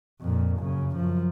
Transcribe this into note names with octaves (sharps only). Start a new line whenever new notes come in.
F2 A#2
F#2 C#3
F#2 F3